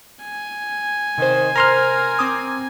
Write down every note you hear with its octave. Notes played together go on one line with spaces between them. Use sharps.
G#5
C3 D#3 C5
A#4 A#5 C6 F6
C4 D6 D#6